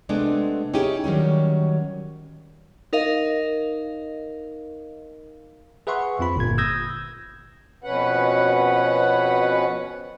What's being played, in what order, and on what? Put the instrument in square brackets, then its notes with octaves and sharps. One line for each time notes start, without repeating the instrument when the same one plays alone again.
[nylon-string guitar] C3 G#3 A3 B3 D4
C#4 D#4 E4 G4 G#4
D#3 F#3 G3 C#4
[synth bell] D#4 A#4 D#5 F5
[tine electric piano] G#4 B4 E5 F#5 C6 C#6
F2 C4 F4 B5
G1 A#2 G#6
D#6 E6 G6 G#6 A#6
[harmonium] F2 B2 C#4 B4 F#5